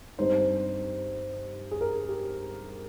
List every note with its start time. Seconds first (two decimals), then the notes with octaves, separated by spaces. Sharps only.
0.18 G2 G3 C4 D#4 C5
1.71 G#4
1.81 A#4
2.09 G4